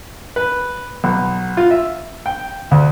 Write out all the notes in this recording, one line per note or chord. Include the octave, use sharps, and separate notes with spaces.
B4
B1
F4
E5
G5
D2